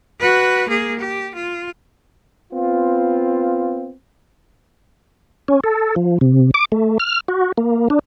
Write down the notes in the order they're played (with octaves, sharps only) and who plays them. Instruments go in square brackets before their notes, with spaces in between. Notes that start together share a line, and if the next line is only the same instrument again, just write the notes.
[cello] F#4 B4
A#3 G#4
G4
F4
[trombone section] B3 C4 F4
[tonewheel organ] C#4
A4
F3
C3
D6
A3
F6
F#4
A#3
D4